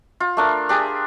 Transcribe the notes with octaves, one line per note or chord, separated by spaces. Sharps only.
F4
A3 D4 A#4
D4 G4 G#4